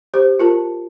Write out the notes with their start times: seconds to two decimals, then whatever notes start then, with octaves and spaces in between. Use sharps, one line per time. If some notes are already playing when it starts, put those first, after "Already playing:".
0.14 G4 C5
0.40 F4 A#4 A5